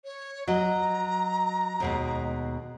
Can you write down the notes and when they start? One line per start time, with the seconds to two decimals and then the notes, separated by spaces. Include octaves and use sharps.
0.05 C#5
0.48 F#3 D#5 A#5
1.80 D#2 B2 G#3